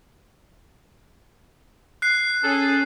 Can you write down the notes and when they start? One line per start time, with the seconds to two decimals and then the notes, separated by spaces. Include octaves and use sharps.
2.02 F#6 C7
2.43 C#4 G#4 A4